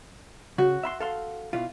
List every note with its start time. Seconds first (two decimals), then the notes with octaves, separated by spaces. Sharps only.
0.58 C#3 F#4
0.83 E5 B5 C6
1.00 A4 F5 C6
1.53 B2 E4 F4